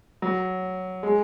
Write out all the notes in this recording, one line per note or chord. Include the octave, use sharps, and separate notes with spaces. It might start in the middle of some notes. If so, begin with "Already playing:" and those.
F#3
G#3